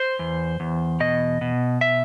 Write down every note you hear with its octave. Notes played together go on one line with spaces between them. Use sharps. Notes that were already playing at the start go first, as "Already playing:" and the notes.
Already playing: C5
E2
E2
B2 D#5
B2
E5